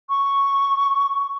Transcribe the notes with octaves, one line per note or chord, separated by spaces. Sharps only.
C#6